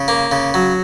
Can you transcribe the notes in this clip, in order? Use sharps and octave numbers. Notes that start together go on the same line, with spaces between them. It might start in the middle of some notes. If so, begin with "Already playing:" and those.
Already playing: C#3
A#3
C#3
F#3